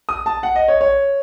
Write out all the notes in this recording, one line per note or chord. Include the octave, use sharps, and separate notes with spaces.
D#6
A5
F#5
D#5
C#5
C#5